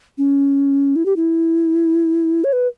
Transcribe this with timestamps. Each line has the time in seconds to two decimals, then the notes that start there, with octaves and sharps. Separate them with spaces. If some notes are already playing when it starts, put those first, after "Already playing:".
0.18 C#4
0.96 E4
1.06 G4
1.16 E4
2.44 C#5
2.53 B4